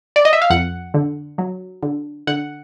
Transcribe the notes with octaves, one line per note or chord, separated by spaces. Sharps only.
D5
D#5
E5
F5
F2 F#5
D3
F#3
D3
D3 F#5